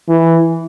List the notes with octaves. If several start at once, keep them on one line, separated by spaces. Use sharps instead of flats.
E3